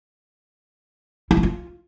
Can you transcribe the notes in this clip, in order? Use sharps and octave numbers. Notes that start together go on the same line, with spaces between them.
E4
C#4
F4